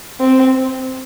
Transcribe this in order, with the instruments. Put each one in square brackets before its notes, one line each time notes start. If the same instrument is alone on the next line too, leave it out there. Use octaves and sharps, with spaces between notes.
[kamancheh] C4